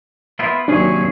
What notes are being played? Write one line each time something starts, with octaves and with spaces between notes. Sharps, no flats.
B3 E4 F4
D#2 C3 F#3 C#4 D4 G#4